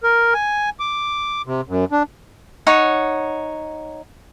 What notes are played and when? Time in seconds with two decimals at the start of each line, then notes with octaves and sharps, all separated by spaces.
0.03 A#4
0.34 G#5
0.80 D6
1.46 C3
1.69 F#2
1.92 D4
2.67 D#4 C#5 F#5